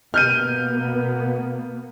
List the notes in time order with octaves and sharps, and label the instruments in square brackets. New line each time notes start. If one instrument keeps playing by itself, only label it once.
[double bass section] B2 A#3 B3 [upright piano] F6 G6 D#7